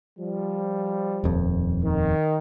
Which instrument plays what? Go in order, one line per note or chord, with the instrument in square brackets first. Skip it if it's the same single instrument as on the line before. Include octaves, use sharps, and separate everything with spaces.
[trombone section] F3 G3
[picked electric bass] D#1 F2
[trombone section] D#3